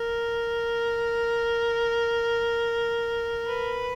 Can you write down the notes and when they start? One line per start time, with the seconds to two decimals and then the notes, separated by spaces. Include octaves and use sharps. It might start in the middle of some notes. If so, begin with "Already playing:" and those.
Already playing: A#4
3.46 B4